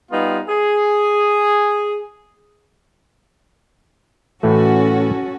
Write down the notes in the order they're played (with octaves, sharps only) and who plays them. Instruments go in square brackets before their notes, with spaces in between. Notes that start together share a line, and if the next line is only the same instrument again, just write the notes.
[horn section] G3 B3 D#4 F4
G#4
[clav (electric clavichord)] A2 E3 A3 [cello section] C#4 F#4 A4